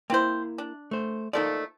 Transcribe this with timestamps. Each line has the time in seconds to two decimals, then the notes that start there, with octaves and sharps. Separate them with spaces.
0.10 A#3 C4 E4 C5
0.58 D4
0.91 A3 C5
1.33 F3 A3 A#3 D#4 A4 D5